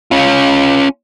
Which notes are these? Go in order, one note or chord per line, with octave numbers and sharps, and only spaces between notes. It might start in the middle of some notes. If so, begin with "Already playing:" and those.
C#4 F4